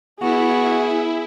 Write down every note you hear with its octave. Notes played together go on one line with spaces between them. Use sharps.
B3 E4 F#4 G#4